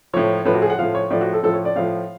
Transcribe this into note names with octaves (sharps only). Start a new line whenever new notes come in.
A2 F3 C#5
A2 F3 B4
F#4
G#4
F#5
A2 F3 F5
C#5
A2 F3 D5
F#4
A4
A2 F3 A4
C#5
D5
A2 F3 F5